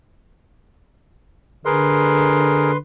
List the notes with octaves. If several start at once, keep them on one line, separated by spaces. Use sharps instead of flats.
D3 G#4 A#4 B4 C6